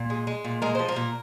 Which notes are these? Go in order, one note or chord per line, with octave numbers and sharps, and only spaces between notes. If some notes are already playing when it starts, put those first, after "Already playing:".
Already playing: A#2
G#3
G#3
A#2
G#3 A#4
F3 C5
A#4
A#2